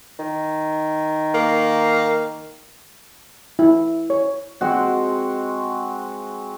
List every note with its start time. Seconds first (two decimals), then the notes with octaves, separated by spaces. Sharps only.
0.19 D#3
1.34 A#3
3.59 E4
4.10 C#5
4.61 G#3 C4 F#4 F#5